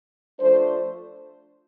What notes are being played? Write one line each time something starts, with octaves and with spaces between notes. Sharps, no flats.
F3 A3 D4 C5